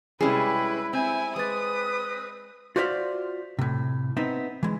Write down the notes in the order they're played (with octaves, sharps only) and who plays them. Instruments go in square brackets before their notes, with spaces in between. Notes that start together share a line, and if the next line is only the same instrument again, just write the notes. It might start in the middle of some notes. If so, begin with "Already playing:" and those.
[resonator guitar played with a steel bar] C3 C#4 G#4 [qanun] G3 G#3 [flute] E4 [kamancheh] B4
[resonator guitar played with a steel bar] C4 [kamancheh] E4 G#5
[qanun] G#3 D5 [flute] B4 [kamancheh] D#6
[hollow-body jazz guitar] F4 F#4 C5 D5 E5 F5
A2 C3
B3 C4 D#4 E5
E3 G#3